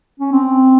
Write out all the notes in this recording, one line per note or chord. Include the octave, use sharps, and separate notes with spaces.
C#4
C4